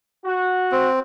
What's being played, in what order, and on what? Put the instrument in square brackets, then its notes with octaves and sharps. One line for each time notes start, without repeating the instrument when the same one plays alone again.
[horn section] F#4
[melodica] C4